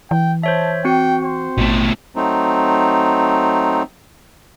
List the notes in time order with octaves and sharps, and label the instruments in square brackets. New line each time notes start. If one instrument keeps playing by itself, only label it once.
[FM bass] E3 [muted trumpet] G5
[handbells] C5 C#5 E5 [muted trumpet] A5
[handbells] C4 F#4 C#7 [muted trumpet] G5
[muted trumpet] C5
[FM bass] A1 [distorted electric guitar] B2 A3
[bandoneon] F#3 A3 C4 D#4